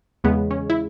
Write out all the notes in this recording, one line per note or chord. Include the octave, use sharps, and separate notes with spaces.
E2 C#3 G#3 B3
C#4
E4